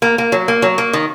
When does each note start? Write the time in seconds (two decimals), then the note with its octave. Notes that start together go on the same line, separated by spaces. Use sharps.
0.02 A#3
0.18 A#3
0.32 F#3
0.48 A#3
0.62 F#3
0.78 A#3
0.93 D#3